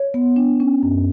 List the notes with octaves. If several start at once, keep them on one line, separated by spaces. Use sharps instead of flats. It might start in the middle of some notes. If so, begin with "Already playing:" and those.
Already playing: C#5
B3
D4
C#4
F#2